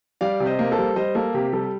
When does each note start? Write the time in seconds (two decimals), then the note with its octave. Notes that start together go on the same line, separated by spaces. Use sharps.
0.21 G3 D5 F5
0.40 C3
0.46 C5 D#5
0.59 A#3
0.72 A4 C5
0.78 G3
0.96 G3 C5 D#5
1.15 A#3 A4
1.34 C3 G4
1.52 G3 A4